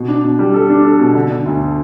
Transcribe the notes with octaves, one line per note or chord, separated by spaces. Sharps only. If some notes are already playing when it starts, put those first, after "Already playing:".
Already playing: B2
D4
B2
G3
A4
D4
A4
B2
D3
D3
D2